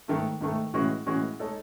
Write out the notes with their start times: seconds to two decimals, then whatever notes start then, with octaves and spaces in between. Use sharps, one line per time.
0.08 G#2 D#3 A3
0.41 G#2 D#3 A3
0.74 A2 E3 G#3 C#4 F#4
1.06 A2 E3 G#3 C#4 F#4
1.40 G#3 D#4 A4 C#5